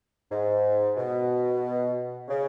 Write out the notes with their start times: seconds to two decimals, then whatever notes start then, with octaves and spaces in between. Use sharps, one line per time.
0.30 G#2
0.97 B2
2.28 C#3